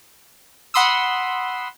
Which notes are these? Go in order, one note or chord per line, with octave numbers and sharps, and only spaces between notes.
F#5 B5 C6 D#6 E6